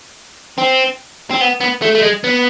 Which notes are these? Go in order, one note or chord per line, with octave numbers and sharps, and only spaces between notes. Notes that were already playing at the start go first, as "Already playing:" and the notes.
C4
C4
B3
B3
A3
A3
G#3
B3